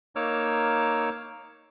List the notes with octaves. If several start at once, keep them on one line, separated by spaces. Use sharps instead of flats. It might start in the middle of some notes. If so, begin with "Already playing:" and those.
A#3 D#4 C#5 D6 E6 F6